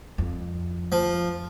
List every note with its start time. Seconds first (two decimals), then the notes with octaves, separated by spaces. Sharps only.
0.18 F2
0.92 F3